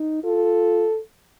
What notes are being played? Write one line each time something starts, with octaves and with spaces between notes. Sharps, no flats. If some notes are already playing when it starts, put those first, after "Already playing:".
Already playing: D#4
F4 A4